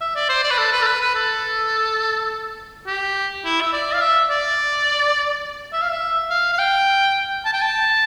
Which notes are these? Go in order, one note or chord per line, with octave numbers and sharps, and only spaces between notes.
E5
D5
C5
D5
B4
A4
B4
A4
B4
B4
A4
G4
E4
E5
D5
F5
E5
D5
E5
F5
E5
F5
F5
G5
A5
G5
A5